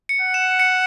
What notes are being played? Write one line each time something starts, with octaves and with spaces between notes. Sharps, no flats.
C#7
F#5
E7
C#7